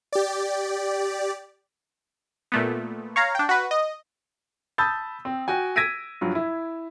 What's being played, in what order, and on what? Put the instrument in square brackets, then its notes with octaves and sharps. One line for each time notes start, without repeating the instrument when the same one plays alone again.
[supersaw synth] G4 D5
[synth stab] A#2 A3 B3
C#5 F5 A#5
D4 G5
F#4 B4
D#5
[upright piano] A5 B5 D#6 E6 G6 A6
C4
F#4 G5 G#5
E6 G#6 A#6 B6 D7 D#7
G2 F3 F#3
E4